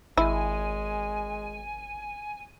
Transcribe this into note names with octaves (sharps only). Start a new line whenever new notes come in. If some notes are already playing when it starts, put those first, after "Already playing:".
G#1 G#3 E4 G#5